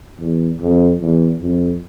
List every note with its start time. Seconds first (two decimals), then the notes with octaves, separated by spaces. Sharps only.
0.19 E2
0.60 F2
1.00 E2
1.41 F2